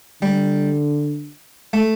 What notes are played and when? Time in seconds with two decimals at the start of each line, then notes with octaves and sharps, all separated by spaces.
0.22 D3 G3
1.73 A3